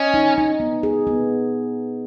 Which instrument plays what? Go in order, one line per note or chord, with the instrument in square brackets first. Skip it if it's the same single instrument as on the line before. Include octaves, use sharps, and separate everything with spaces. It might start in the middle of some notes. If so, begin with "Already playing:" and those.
Already playing: [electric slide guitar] C#4 [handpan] D#5
[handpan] D#4
D#4
B3
G#4
B3